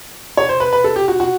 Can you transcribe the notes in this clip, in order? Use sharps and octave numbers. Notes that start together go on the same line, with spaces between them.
C#5
C5
B4
B4
A4
G4
F#4
F#4